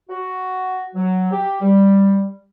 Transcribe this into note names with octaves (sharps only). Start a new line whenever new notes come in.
F#4
F#3
G4
G3